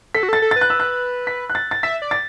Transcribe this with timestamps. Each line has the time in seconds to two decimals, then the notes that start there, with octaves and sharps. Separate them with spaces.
0.15 A4 B6
0.23 F#4
0.29 A4 A6
0.42 A4
0.51 A6
0.56 B4
0.61 F#6
0.70 E6
0.80 F#6
1.27 B6
1.50 F#6
1.55 A6
1.71 A6
1.83 E5 B6
2.02 D5
2.11 A6